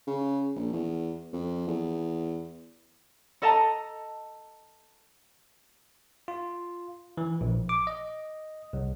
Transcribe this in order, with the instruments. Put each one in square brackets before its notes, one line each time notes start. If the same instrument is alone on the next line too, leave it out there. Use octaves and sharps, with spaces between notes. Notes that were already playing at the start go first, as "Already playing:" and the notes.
[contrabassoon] C#3
A#1
E2
F2
E2
[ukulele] A4 D#5 A5 A#5
[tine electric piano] F4
E3
A#1
D6
D#5
C2